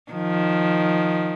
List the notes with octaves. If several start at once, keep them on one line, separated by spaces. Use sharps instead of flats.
D#3 F3